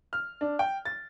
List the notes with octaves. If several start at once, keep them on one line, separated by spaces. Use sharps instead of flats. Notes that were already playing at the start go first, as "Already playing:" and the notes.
F6
D4
G5
A6